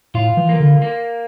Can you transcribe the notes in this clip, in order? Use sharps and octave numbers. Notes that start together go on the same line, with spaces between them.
A2 F4
E3
A#3
D3
A#3